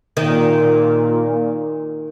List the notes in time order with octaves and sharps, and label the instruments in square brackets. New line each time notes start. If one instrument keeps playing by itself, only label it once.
[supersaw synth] A#2 [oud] D#3